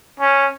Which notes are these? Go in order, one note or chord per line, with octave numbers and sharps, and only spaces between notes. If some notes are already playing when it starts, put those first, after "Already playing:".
C#4